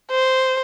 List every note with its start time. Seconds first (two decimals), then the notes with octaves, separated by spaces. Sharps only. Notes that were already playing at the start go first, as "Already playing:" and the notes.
0.11 C5